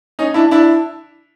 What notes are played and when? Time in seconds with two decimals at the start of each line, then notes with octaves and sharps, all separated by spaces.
0.19 C#4 D#4
0.34 D4 E4
0.51 D4 E4